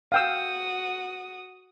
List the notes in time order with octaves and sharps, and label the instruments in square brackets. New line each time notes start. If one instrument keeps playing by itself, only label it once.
[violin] F#4 D#6 [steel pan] F5 G5 E6